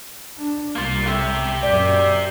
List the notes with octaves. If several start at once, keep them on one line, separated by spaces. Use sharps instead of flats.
D4
C2 G3 A#3 F4
A2 G4 E5
F#2 A#2 D5